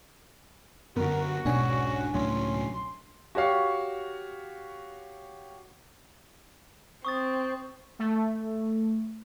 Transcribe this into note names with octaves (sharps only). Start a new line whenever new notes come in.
F#2 D3 B3 F#4 A#4
E1 B1 G#2 B2 C#4 D4 G#5
C#2 A2 F#3 C#4 C6
F#4 G4 C#5 F5 C#6
C4 C#6 D#6 A6
A3